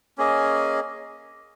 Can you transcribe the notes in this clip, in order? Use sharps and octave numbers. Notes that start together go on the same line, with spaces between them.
A#3 C#4 G#4 D#5